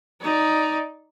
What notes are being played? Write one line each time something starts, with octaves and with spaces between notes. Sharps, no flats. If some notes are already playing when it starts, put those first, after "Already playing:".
D#4 D5